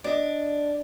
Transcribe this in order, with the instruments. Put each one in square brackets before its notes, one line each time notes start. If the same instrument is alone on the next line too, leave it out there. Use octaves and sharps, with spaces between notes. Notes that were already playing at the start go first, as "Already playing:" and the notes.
[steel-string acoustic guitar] D4 [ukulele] D5 D#5